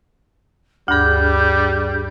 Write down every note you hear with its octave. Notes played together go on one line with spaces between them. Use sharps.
D2 G2 G3 D4 G#4 G6